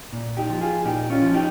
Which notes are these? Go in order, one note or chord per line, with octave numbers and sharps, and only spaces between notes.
A#2
D#4 G4
F3
F4 G#4
A#2 D#4 G4
C#4 F4
F3
D#4 G4